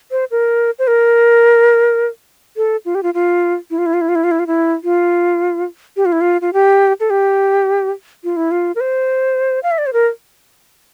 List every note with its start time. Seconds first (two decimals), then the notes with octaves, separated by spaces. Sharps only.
0.11 C5
0.31 A#4
0.79 C5
0.87 A#4
2.57 A4
2.85 F4
2.95 G4
3.03 F4
3.14 F4
3.71 E4
3.78 F4
3.86 E4
3.94 F4
4.01 E4
4.09 F4
4.15 E4
4.24 F4
4.31 E4
4.39 F4
4.47 E4
4.84 F4
5.97 G4
6.06 F4
6.12 E4
6.21 F4
6.41 F4
6.53 G4
7.00 A4
7.10 G4
8.24 F4
8.36 E4
8.51 F4
8.76 A#4
8.80 C5
9.63 F5
9.72 E5
9.78 D5
9.86 C5
9.93 A#4